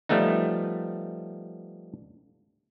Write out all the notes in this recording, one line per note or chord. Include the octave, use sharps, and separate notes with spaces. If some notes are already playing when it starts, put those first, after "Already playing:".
F3 G3 A3 B3 D#4